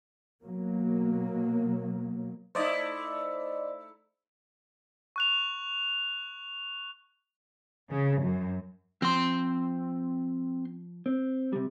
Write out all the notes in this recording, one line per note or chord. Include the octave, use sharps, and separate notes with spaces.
B2 F#3 A#3
A3 D#4 E4 C5 D5 D#5
C#6 F#6 F7
C#3
F#2
F3 C4 C6
C4
C3 G3